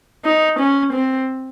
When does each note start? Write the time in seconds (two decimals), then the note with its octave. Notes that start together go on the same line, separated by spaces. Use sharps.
0.25 D#4
0.59 C#4
0.93 C4